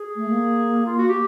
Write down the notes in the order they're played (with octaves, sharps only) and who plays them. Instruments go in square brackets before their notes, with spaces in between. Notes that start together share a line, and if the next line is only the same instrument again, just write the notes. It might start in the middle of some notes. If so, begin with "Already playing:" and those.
Already playing: [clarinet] G#4
[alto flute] A3
A#3
[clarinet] F4
F#4
G4